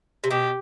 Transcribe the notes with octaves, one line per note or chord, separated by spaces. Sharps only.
C3
B2 G4